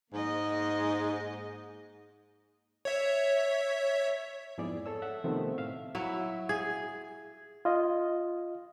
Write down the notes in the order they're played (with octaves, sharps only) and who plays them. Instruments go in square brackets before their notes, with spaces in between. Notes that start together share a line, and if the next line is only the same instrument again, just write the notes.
[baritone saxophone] G#2 [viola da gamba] A#3 D#5
[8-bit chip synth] C#5 E5
[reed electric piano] F2 G#2 B3 E4 G#4 D5
A4 C#5 E6
E5 F#5
C3 D#3 F3 A3 B3 C4
A2 E5 F5
[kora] F#3 E4
[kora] G#4 [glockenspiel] G#6
[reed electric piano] F4 D#5